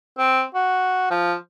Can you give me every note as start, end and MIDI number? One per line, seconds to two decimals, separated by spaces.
0.18 0.42 60
0.55 1.09 66
1.10 1.34 53